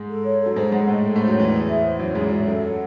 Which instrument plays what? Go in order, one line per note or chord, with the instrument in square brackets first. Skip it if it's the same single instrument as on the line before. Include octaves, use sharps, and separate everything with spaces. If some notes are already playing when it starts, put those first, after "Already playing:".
Already playing: [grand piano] G#2 G#3
[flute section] A4
C#5
A4
[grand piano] F#3
[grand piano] G#2 G#3 [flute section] C5
[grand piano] G#2 G#3 [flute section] F#5
[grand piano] A2 A3 [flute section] D#5
[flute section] A4
[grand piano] A2 A3 [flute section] C5
[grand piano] F#2 F#3
[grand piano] E2 E3 [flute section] F#5
[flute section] G#4
E5
C5
[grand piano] F#2 F#3 [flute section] E4
[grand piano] G#2 G#3 [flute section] G#4
[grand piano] F#2 F#3 [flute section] E5
[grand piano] F#2 F#3 [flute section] A4
[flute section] F#5